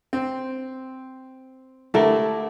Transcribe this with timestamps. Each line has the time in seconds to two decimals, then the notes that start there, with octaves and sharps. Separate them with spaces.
0.13 C4
1.94 D3 G3 A3 E4 A4 A#4